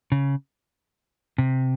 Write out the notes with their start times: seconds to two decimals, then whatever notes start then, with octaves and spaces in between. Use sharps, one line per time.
0.12 C#3
1.38 C3